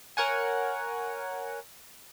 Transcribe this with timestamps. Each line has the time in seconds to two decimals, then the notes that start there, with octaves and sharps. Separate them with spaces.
0.17 A#4 C#5 F#5 G#5